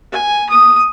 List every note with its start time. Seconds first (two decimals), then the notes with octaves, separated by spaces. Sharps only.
0.13 G#5
0.49 D#6